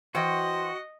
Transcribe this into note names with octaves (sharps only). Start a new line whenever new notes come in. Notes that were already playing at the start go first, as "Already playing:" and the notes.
E3 F#4 C5 D#5 G5 C6